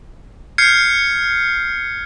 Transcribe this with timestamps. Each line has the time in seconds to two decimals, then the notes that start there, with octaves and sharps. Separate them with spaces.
0.58 F6 G6 G#6 C7 C#7